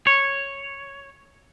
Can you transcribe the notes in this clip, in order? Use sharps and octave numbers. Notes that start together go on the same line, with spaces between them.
C#5